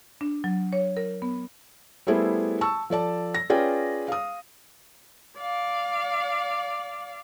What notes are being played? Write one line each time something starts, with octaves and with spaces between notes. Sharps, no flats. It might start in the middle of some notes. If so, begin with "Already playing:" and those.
D4
F#3
C#5
A#4
B3
G3 A3 B3 E4 G#4 C5
A5 C#6 E6
F3 A4 D5 A5
A#6
C#4 F4 G#4 B4 D5 G5
F5 D#6
D5 F5